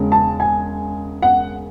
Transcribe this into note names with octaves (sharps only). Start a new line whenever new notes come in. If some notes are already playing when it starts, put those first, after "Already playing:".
Already playing: E1 C#3 G#3
A5
G#5
F#5